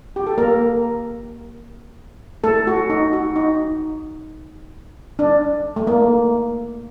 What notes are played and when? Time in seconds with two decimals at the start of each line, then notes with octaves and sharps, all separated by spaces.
0.16 G4
0.27 A4
0.38 A#3 A#4
2.44 A3 A4
2.67 F#4
2.90 D#4
3.13 F#4
3.36 D#4
5.19 D4
5.76 A3
5.87 A#3